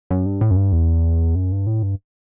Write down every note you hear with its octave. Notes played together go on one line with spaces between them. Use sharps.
F#2
G2
A2
F#2
G2
E2
F#2
G2
A2
G2